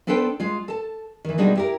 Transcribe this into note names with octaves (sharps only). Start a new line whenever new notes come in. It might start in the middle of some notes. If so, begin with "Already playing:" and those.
B3 D4 A4 B4 C5 G5
G#3 F4
A4 A5
D#3 E3
B2 G3 G#3 D4 D#4 F#4
E4 G4 A#4